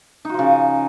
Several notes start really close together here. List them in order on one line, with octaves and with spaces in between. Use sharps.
D#4 F#4 F3 C#3